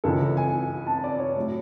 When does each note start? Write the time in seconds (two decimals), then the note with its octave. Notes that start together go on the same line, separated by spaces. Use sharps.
0.04 C#2 C#3 E3 A4
0.37 G#5
0.87 A5
1.04 D5
1.19 C#5
1.36 A2 F#3 A3